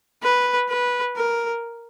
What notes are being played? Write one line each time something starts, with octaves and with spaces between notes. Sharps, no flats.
B4
B4
A#4